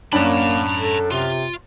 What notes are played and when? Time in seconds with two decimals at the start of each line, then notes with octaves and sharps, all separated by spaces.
0.13 F#2 A#3 C#4 D4 A5 B5
0.76 A4
1.11 C3 F4